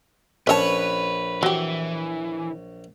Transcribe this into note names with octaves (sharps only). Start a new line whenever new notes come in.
A#1 C#4 B4 C#5 D#5 A5
E3 F#3 G4